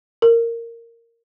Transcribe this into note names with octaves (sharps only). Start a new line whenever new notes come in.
A#4